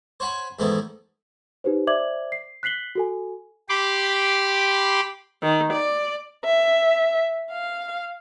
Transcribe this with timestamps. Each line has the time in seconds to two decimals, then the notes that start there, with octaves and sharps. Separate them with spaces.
0.20 C5 C#5 F#5 G#5 B5
0.59 E2 G#2 D#3 A3 B3 E4
1.64 D#4 G4 B4 C5
1.87 C5 D5 E5 D6 G#6 F#7
2.32 C7
2.63 F#6 B6 C7 F#7 G7
2.95 F#4 A4 G#5
3.69 G4 B5 C6 D6
5.43 D#3
5.71 D5
6.44 E5
7.51 F5